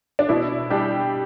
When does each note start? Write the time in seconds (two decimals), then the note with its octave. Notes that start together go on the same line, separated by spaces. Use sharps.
0.19 D4
0.29 B2 E4
0.70 G3 D4 G4